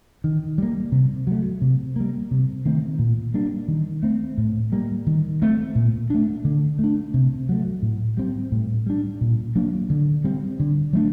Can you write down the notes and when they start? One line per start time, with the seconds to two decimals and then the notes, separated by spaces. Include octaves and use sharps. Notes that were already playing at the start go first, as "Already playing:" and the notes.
0.24 D#3
0.58 G3 A#3
0.92 C3
1.27 F#3 A3
1.62 C3
1.96 G3 A#3
2.31 C3
2.65 D#3 A3 C4
2.99 A#2
3.34 G3 A#3 D4
3.68 D#3
4.03 A3 C4
4.38 A2
4.72 G3 A#3
5.07 D#3
5.42 A3 C4
5.76 A#2
6.10 A3 D4
6.45 D3
6.79 A3 D4
7.14 C3
7.49 F#3 A3
7.83 A2
8.17 G3 C4
8.52 A2
8.87 G3 D4
9.21 A#2
9.56 F#3 A#3 D4
9.90 D3
10.24 G3 C4
10.60 D3
10.93 F#3 A3 D4